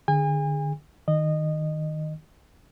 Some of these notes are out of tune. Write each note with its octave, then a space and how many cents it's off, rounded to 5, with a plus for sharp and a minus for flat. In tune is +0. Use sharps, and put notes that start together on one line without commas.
D3 +20 G#4 -15 G#5 -40
D#3 +0 D#5 -20